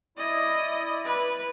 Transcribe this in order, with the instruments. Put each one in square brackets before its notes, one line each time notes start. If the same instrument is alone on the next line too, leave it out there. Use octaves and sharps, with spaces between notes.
[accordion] E4 D5 [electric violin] D#5
[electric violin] B4